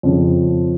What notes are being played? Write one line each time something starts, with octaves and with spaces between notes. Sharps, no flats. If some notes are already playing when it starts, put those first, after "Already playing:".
F2 C#3 F3